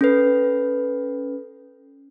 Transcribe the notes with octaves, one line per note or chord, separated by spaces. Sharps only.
C#4 A4 B4